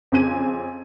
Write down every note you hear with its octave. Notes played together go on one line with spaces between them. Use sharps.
F2 C#3 C4 G#5 G#6 D#7